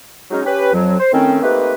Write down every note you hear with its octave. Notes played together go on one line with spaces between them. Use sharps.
F#3 G#3 C#4 D#4
C#4 G4 B4
F2 F#3
C5
A2 D#3 C4 C#4
A3 A#3 C4 D#4 G4 B4